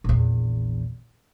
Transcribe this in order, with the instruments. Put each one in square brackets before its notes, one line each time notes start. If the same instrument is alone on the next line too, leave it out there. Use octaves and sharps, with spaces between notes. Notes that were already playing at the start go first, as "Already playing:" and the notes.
[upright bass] A#1 E2